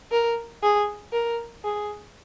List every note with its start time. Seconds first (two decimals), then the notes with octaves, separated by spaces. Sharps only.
0.11 A#4
0.63 G#4
1.13 A#4
1.65 G#4